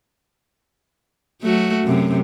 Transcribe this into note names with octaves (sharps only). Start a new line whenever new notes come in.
F#3 A3 F#4
F#2 C3